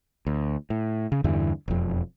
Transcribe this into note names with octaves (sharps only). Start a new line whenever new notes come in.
D2
A2
C#3
E2 G2 D3 E3
E1 F2